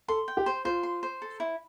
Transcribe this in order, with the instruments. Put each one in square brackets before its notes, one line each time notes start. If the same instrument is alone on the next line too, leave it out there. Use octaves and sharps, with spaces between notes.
[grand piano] A4 [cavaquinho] C6
[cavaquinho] G5
[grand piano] G4
[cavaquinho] C5
[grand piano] F4 [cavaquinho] C5
[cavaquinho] C6
C5
A4
E4